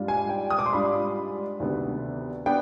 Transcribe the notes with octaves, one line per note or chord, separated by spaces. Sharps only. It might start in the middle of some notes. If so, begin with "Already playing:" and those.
Already playing: G#2 G3 D4 F4
G#5
G5
D#6
D6
C6
G#2 G3 D4 F4 B5
D2 C3 D#3 B3 D4
B3 D4 G5